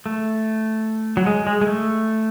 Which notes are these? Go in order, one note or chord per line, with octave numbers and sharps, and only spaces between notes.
A3
F#3
G#3
G#3
G#3
A3